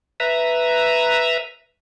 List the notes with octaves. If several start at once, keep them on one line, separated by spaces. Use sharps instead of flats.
B4 E5 A#5